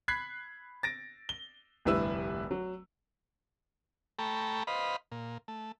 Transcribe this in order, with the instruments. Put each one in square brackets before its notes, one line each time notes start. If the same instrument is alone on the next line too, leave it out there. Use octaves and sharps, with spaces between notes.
[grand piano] B5 F#6 G#6 B6 C7
A6 A#6 D7
G7
F1 D2 G2 E4 B4 E6
F#3
[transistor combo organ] A3 A4 G5 A#5 B5 C#6
B4 C5 D#5 F5 B5
A#2
A3